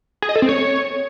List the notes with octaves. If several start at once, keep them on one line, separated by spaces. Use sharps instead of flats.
G#4
D#5
A4
C4
C#5